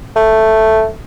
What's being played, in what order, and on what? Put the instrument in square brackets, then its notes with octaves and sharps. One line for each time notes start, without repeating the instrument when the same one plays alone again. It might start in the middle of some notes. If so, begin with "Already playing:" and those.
[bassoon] A3